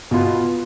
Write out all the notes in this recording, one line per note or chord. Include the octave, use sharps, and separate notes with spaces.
B2 B3 F4